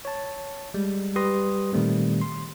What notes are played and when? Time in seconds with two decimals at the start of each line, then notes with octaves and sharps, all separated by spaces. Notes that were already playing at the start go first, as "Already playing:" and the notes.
0.05 C#5 A5
0.74 G3 G#3
1.16 G3 G4 B4 C6 D#6 A#6
1.73 A#2 D#3 G3 A3 C4
2.21 C6